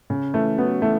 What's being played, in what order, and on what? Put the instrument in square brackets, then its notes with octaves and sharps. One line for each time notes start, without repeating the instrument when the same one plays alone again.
[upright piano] C#3
[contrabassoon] E3 [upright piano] A3
[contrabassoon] F#3 [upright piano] B3
[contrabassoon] E3 [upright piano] A3